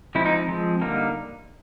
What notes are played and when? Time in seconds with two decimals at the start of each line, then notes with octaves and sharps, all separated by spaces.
0.15 F3 G#3 C4 E4
0.26 D#4
0.48 F3 G#3 C4
0.82 D3 G3 A#3 D#4